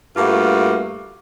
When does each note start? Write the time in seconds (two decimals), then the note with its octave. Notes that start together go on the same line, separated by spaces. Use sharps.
0.16 G2 A3 A#3 F4 F#4